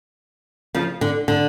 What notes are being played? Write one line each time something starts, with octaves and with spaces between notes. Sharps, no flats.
C#3 F3
D3
D3